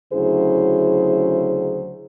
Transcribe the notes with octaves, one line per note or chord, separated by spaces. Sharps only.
D2 C#3 F#3 E4 G#4 C5